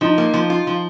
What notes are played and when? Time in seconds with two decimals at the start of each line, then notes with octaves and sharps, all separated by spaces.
0.01 F3 D#4
0.18 A#3
0.34 F3
0.50 F4
0.67 F3